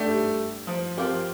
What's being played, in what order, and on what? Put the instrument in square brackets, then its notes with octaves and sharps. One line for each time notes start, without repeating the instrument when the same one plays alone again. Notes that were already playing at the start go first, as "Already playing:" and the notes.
Already playing: [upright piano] A3 [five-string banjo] D4 G4 D5
[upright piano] G3
F3
[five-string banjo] F3 C4 G4 A#4